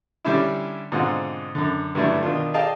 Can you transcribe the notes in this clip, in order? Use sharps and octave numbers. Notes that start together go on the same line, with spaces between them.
D3 G3 C#4 D4 E4
G#2 B2 D3 C4 F4 F#5
F#2 D3
G2 D3 F#3 A3 D4 E4
B2 D#3 D4 F4
G#4 D5 D#5 F5 G5 A5